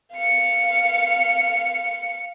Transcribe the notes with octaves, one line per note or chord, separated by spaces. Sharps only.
F5 C#7